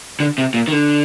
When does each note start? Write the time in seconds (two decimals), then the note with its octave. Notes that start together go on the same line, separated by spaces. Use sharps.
0.20 D3
0.38 C3
0.54 A#2
0.68 D#3
0.72 D3